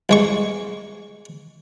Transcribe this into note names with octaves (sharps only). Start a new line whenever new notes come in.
C2 G#3 C#6